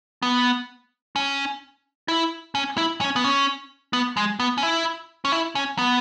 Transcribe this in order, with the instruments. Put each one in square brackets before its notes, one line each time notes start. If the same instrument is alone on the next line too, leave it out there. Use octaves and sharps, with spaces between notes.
[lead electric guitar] B3
C#4
E4
C#4
E4
C#4
B3
C#4
B3
G#3
B3
C#4
E4
C#4
E4
C#4
B3